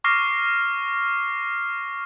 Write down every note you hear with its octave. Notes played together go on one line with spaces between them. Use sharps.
C#6 D6 F6 A#6 C7